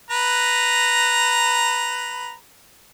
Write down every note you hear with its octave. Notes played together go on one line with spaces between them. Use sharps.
B4 A#5